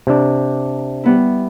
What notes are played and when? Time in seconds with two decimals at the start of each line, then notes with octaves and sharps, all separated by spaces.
0.07 C3 D4
1.04 G3 B3 E4